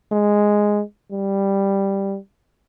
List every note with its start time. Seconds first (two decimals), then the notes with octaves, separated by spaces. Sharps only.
0.12 G#3
1.12 G3